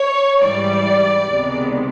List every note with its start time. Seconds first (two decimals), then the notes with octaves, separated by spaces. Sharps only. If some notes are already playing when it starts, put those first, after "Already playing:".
Already playing: C#5
0.41 G#2 E3 G3 D5
1.27 C#2 C3 D#3 G#3 B3